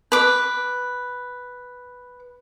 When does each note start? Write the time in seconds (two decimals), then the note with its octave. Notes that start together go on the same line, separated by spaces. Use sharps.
0.12 B4 D6